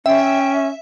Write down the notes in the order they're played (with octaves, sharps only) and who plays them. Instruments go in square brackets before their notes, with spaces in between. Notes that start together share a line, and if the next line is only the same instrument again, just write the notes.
[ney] C#4 [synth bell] E5 [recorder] G5